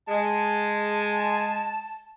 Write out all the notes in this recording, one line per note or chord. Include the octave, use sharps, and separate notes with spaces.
G#3 A5